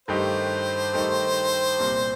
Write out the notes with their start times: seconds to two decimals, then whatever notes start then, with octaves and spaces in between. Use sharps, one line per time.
0.08 G2 D#3 A3 D#4 G4 C5
0.93 G2 D#3 A3 D#4 G4
1.79 C2 A#2 G3 C4